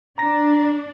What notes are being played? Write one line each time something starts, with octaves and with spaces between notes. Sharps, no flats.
D4 A#5 A#6